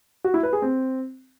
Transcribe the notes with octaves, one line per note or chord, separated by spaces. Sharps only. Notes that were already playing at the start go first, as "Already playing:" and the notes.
F#4
E4
B4
G#4
C4